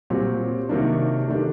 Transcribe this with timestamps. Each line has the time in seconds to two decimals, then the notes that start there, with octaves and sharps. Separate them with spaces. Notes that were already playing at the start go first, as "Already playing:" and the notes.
0.10 A#2 F#3 C4 G4
0.69 C3 D#3 F#3 A#3 D4
1.28 D#3 A3 D4 G4